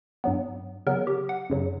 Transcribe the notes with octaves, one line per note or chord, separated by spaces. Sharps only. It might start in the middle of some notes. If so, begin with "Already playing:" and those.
G2 F#3 B3
C#3 F#3 B3 A#4
G4
F#5
F#2 C#3 F#3